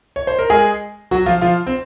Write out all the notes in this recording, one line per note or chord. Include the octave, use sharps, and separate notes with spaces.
C#5
C5
A#4
G#3 G#4
F#3 F#4
F3 F4
F3 F4
C4